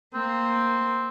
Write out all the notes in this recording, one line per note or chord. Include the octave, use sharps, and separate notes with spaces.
A#3 C4